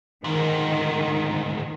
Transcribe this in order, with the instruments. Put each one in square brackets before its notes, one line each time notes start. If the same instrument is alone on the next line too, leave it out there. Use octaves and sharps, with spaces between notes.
[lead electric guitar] D2 G#2 [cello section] D#3